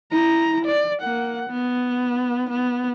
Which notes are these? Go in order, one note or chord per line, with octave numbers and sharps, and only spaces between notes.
E4 A#5
D5
A#3 F#5
B3
B3